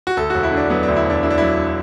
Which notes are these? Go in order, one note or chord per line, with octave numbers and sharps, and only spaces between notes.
F#4
D2 A4
E1 F#4
E4
D3
D4
F#3 B3
D4
D2
E4
E1 D4
D3 E4
D4
F#3 E4